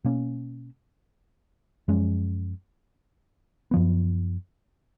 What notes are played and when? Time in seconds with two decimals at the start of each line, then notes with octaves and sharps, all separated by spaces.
0.04 B2 A#3 C#4
1.88 F#2 F3 G#3 C#4
3.71 F#2 F3 B3